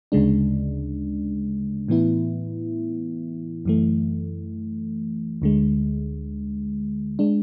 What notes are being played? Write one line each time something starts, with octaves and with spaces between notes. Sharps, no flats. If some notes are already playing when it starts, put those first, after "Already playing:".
D2 C#3 G#3 D4
A2 E3 B3 E4
F#2 E3 A3
D2 D3 G#3
G#3 D4